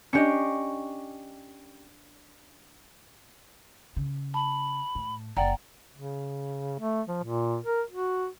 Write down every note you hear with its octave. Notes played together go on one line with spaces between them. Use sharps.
C#4 D4 G4 D#5 C#6
C#3
A5 B5
A2
F#1 D5 F#5 G5 A#5
C#3
A3
F3
A#2
A#4
F#4